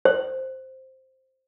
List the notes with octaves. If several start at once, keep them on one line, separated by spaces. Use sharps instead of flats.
C5